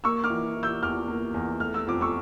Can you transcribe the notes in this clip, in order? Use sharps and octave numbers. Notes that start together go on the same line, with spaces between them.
A#3 C#6 E6
D6 F6
E3
E3
E6 G6
E2 D6 F6
A#3
E2
A3 F6
E6
F2 D6
C#6 E6